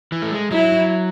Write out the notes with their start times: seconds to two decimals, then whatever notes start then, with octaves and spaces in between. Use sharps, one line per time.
0.12 E3
0.22 A3
0.32 G#3
0.51 F#3 E4